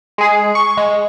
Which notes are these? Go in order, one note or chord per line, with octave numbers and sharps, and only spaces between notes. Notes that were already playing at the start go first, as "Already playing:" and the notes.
G#3 G#4
C#6
G#3